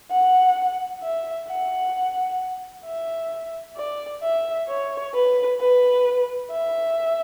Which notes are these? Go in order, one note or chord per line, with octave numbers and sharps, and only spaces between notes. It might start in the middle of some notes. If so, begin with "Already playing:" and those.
F#5
E5
F#5
E5
D5
E5
C#5
B4
B4
E5